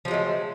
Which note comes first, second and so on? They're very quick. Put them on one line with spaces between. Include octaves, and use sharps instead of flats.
F3 F#3 G#3 A3